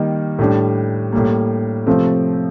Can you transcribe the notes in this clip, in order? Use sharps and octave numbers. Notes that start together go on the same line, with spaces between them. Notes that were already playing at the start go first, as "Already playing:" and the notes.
Already playing: D#3 G3 A#3 D#4
A2 G3 D4
A2 G3 A#3
C3 F3 A3 C4